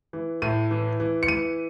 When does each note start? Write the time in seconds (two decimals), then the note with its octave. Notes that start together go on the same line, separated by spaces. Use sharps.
0.13 E3
0.42 A2 D#7
0.71 E3
1.00 E3
1.23 C#7
1.28 E3 D#7